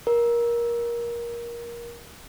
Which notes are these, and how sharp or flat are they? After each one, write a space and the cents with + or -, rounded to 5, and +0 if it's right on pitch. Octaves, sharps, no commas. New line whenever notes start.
A#4 +20